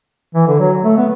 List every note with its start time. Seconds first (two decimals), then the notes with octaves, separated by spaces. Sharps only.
0.34 E3
0.47 D3
0.60 F#3
0.84 A3
0.97 B3